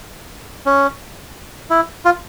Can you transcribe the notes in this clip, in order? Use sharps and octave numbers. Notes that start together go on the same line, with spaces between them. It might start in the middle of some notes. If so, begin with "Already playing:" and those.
C#4
E4
F4